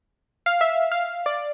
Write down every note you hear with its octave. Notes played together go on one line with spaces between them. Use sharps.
F5
E5
F5
D5